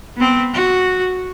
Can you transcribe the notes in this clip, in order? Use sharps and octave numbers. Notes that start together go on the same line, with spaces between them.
B3 C4
F#4